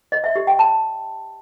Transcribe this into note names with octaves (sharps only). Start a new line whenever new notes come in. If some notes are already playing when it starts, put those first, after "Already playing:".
D#5
E5
G4
G5
A5